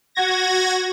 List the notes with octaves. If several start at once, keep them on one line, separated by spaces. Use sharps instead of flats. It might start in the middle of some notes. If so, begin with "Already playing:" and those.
F#4 G#6 A#6